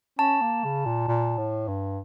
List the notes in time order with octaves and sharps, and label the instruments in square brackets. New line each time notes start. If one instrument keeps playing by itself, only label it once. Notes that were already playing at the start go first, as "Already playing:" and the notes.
[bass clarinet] C#4 [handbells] A5
[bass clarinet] A#3
C#3
A#2
A#2
A2
G2